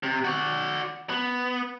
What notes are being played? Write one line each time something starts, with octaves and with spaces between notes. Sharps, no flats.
C3
F#4 D5
B3